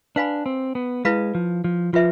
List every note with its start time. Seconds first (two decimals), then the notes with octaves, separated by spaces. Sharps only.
0.16 D4 B4 F5 G#5 B5
0.46 C4
0.75 B3
1.05 G#3 E4 B4 F5 B5
1.35 F3
1.64 F3
1.93 F3 F4 B4 E5